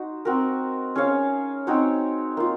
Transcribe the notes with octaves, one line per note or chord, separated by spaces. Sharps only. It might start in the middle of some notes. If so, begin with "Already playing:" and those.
Already playing: D#4 F#4 C5
C4 F#4 A#4
C#4 G#4 C#5 F5
C4 D#4 F#4 C#5
A#3 F4